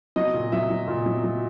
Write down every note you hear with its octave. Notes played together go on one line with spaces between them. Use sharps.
F#3 D#5
A#2
F#3 E5
F#3
A#2
F#3
F#3